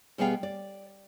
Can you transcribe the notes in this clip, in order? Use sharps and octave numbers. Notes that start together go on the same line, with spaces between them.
B2 G3 B3 G#4 F5 G5
D5